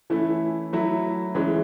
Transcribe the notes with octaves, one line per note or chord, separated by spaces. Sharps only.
E3 A3 C#4 E4
F#3 A3 E4
E3 G#3 C#4